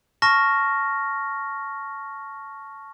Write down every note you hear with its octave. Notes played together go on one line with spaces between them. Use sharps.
A5 C#6 F6 A#6